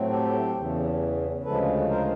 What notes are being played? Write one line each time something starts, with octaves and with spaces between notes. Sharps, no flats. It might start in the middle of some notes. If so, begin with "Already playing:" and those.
Already playing: A2 F#3 A3 C4
G4 A4
E2 C#3 E3
D2 C#3 F3 G#3 A4 B4
A#4 C5